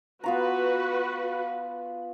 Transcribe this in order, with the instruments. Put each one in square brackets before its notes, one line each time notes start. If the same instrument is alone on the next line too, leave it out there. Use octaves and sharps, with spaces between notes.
[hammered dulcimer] B3 F4 A#5 [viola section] F#4 B4